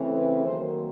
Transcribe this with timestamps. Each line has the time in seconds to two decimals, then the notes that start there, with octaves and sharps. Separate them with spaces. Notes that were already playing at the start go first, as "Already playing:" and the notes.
Already playing: C#3 E3 A3 C4
0.18 B4
0.46 D#3 F#3 A#3 C5